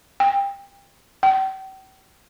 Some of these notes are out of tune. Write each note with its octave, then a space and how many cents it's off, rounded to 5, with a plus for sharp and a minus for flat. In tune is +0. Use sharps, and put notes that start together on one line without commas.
G5 +25
G5 -40